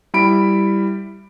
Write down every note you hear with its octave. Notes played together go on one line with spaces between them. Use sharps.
G3 E4 B5 D7